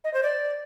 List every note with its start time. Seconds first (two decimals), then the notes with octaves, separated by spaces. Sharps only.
0.04 D#5
0.14 C5
0.23 D5